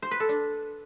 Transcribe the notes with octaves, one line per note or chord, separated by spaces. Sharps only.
C5
B4
A4
D4